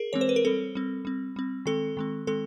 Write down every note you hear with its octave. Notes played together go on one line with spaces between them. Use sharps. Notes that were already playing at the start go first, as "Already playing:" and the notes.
Already playing: G#4 A#4
E3 G#3 C4 C#5
C5
B4
A#4
G3 C4 A4
G3 C4
G3 C4
G3 C4
D#3 G#3 C4 A4
D#3 G#3 C4
D#3 G#3 C4 A4